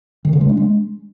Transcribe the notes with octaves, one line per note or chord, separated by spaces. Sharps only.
D#3
C#3
G#3
D4
G#3